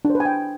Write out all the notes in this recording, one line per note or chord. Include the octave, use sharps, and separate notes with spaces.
D4
C5
B4
G#5
G5